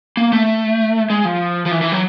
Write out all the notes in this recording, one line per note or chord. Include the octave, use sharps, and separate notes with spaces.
A#3
A3
G#3
F3
F3
E3
E3
F#3